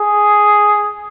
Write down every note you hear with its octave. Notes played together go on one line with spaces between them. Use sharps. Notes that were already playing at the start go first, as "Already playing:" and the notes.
Already playing: G#4